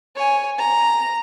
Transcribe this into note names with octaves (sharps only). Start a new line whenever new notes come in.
C#5 G#5
A#5